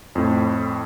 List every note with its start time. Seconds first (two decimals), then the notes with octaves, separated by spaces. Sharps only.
0.15 F2 A2